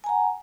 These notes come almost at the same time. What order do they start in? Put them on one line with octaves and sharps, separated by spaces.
G#5 A#5 F#5